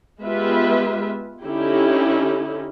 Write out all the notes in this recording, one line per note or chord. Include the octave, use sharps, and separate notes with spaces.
G#3 B3 F4 G4 B4 E5
D3 C#4 D#4 E4 G4